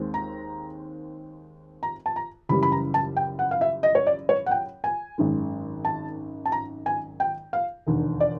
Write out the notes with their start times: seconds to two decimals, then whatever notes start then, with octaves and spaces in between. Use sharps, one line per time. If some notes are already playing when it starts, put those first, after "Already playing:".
Already playing: D#2 D#3 G#3 C4
0.14 A#5
1.83 A#5
2.06 A5
2.16 A#5
2.49 F#1 F#2 C#3 E3 G3 B5
2.63 B5
2.72 A#5
2.94 A5
3.16 G5
3.39 F#5
3.51 F5
3.61 E5
3.83 D#5
3.95 C#5
4.07 D5
4.29 C#5
4.46 F#5
4.51 G5
4.84 G#5
5.18 G#1 F#2 D#3 G#3
5.85 A5
6.45 A5
6.52 A#5
6.86 G#5
7.20 G5
7.53 F5
7.87 E1 D#2 D3
8.20 D5